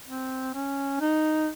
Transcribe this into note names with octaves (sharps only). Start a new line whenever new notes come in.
C4
C#4
D#4